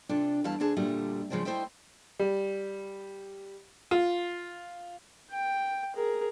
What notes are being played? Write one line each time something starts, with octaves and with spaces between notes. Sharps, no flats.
C3 D4 F4 A4
E2 G3 E4 F5 A5
D2 D3 D4 G#4 A5
D2 A#2 D3 G3 A3
C#3 F3 G#3 C4 D4
A3 E4 C5 D#5 E5 G5
G3
F4
G5
G#4 A#4